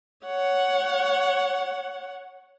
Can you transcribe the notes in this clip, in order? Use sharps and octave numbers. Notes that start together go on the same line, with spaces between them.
C#5 F#5